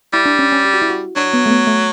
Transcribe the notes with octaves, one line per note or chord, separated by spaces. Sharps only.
G3 E4
D4
C#4
C#4
G4
F#4
E4
F#4
F#3 D4
B3
A3
B3
A3